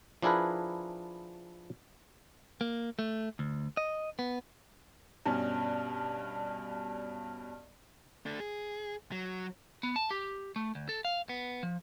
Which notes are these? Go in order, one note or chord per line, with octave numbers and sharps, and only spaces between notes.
F3 D4 E4 G#4 A#4 B4
A#3
A3
D2
D#5
B3
G2 B2 C#4 D4
A3 D4
G#4
F#3
B3
A5
G4
A3
D2
A4
F5
B3
F3